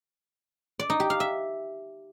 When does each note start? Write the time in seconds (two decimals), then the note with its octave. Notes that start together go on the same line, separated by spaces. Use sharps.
0.79 D5
0.90 D#4
1.00 G4
1.10 F5
1.20 E5